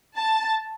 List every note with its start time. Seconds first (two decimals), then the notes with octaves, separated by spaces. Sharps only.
0.16 A5